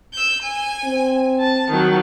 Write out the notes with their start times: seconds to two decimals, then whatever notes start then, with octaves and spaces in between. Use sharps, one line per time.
0.13 E6 G6
0.42 G#5
0.86 C4
1.39 A5
1.69 D#3 F#3